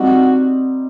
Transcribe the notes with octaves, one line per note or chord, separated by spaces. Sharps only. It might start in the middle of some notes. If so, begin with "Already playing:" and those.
Already playing: G3 C4 D#4 F#4